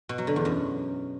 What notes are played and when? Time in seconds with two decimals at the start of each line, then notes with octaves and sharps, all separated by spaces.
0.09 B2
0.18 F#3
0.27 D3
0.36 E2
0.45 F#2